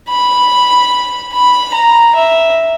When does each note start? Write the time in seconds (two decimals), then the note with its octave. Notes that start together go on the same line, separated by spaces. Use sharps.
0.10 B5
1.34 B5
1.75 A#5
2.15 E5